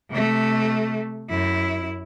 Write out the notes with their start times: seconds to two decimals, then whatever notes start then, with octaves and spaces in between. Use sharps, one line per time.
0.10 C3 A3
1.29 F#2 E4